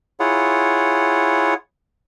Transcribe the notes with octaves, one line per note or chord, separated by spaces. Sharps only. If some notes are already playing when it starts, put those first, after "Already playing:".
E4 F4 G#4 C#5 F#5